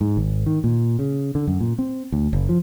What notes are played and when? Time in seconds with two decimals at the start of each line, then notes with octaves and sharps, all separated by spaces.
0.01 G#2
0.17 G#1
0.46 D#3
0.64 A#2
0.99 C#3
1.35 D3
1.47 F#2
1.60 A#2
1.79 C4
2.12 D2
2.33 F#1
2.49 F3